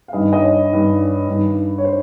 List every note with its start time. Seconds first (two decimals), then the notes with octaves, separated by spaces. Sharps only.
0.08 F5
0.13 G2 D#3 D#5
0.33 D#5
0.42 C#5
0.71 G2 D#3
1.28 G2 D#3
1.78 C#5
1.85 C5